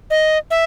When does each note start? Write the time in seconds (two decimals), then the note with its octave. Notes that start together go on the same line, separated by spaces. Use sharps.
0.10 D#5
0.51 E5